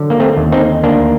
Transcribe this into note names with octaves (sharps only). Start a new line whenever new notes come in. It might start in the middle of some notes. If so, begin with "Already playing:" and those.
Already playing: D3 F#3
A#3
A3 C4
D#2
C4 D#4
D2 A#3 D4